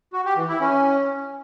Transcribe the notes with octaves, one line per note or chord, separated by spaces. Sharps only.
F#4
G4
E3
E4
C#4